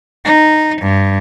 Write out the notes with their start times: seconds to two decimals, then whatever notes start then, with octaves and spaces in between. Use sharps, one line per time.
0.25 D#4
0.81 G2